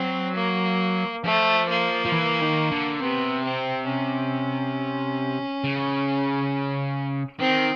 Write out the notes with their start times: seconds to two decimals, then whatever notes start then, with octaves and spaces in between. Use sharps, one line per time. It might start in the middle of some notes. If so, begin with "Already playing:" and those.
Already playing: F#3 C4
0.36 A#3
1.24 F3 A3
1.69 A#3
2.05 F3
2.12 E3
2.41 D#3
2.71 D3
3.00 C3 B3
3.44 C4
3.88 C#4
5.64 C#3
7.40 D#3 C4